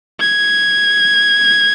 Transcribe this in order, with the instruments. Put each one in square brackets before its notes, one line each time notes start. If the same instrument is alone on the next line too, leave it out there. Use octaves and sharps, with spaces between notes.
[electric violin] G#6